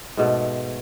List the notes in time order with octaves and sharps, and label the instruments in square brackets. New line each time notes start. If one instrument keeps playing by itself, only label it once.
[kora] G#2 B2 A3